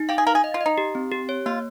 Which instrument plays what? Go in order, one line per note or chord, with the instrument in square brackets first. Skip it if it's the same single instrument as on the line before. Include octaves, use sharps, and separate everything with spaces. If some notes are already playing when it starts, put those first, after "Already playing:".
Already playing: [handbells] D#4
[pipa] G4 [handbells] F5
[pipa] G#4
[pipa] A#4 [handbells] F5
[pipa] G#4
[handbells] D#5
[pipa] F4
[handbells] D#5
[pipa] D#4
[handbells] G4
C4
G4
C#5
[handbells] A#3 [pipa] F4